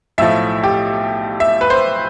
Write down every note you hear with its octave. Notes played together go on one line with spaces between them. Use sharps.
B1 A2 F3 E5
G4
E5
B4
C5